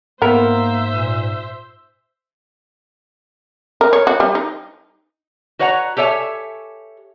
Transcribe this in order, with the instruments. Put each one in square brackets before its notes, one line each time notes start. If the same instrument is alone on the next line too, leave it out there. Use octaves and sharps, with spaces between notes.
[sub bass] G#2 [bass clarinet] A#3 [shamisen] B3 A#4 [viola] C5 E5
[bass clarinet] A#2
[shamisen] A#4
C#5
F#4
G3
D#4
[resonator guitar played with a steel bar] F#4 B4 C#5 F#5 G#5 A#5
G4 A4 C#5 E5 G#5